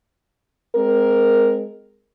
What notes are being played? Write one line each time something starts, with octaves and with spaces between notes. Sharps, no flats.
G#3 C4 A#4